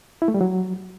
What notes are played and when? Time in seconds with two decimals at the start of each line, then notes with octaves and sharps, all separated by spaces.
0.22 E4
0.28 A3
0.34 G3
0.41 F#3